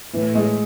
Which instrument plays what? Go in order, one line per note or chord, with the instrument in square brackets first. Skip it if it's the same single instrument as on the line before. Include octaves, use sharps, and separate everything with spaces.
[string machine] A2 [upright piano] E3
[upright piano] G#3